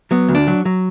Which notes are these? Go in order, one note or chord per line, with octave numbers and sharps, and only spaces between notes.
F#3 B3
D2
D4
F#3
F#3